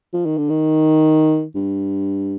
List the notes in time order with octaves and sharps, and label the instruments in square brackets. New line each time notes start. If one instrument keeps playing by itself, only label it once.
[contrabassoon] F3
D#3
D3
D#3
G2